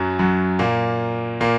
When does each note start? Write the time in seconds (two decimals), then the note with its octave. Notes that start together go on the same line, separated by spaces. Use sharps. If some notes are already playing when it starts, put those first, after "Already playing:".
Already playing: F#2 F#3
0.19 F#2 F#3
0.59 A#2 A#3
1.41 A#2 A#3